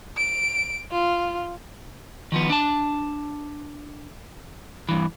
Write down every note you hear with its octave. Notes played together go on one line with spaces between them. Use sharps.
D7
F4
D#3 F3 B3
D4 A5
G2 E3